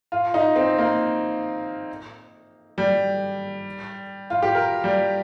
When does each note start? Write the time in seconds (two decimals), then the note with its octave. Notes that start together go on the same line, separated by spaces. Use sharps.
0.12 F4
0.34 D#4
0.56 C4
0.78 A#3
2.78 G3
4.30 F4
4.42 G4
4.55 A#4
4.84 G3